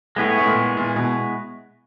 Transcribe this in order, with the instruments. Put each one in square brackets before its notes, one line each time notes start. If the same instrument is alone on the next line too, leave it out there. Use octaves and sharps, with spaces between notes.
[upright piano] A2 [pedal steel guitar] G#3 B3 E4 G#4 C#5
[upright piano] A2
A#2
A#2
B2